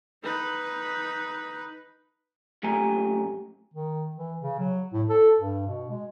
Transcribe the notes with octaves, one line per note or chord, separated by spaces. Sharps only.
D#4 B4
F#2 A#2 A3 G4 G#5 A#5
D#3
E3
C#3
F#3
A2
A4
G2
B2
G#3